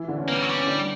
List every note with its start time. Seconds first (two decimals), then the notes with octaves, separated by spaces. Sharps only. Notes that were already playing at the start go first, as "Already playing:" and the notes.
Already playing: E3 E4
0.08 D3 D4
0.18 C#4
0.28 A#3 B3
0.35 G3
0.42 F#3
0.49 G3
0.55 C#4
0.67 D3 D4